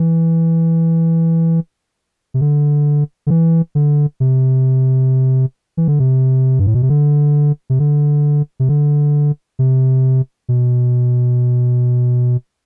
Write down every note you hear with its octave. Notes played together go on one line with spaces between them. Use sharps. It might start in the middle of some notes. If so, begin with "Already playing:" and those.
Already playing: E3
C3
D3
D3
E3
D3
C3
E3
D3
C3
G2
A2
B2
C3
D3
C3
D3
C3
D3
C3
B2